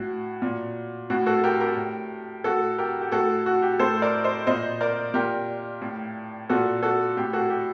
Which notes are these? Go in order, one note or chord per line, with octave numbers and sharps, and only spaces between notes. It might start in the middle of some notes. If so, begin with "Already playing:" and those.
Already playing: A2 F#4
A#2
A2 F#4
F#4 A4
G4 A#4
G4 A#4
A2
A2 F#4 A4
G4 A#4
G4
A2 F#4 A4
F#4
G4
A2 A4 C5
A#4 D5
C5 D#5
A#2 C5 D#5
A#4 D5
A#2 G4 A#4
A2
A#2 F#4 A4
F#4 A4
A2 G4
F#4 A4
G4